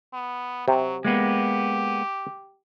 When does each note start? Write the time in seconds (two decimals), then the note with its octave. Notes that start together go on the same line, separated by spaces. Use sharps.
0.14 B3
0.68 C3 F#3
1.05 G#3 A#3 B3 G4